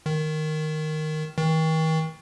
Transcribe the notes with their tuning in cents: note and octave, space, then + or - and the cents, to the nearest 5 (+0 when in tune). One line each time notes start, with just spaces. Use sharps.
D#3 -5
D#3 +40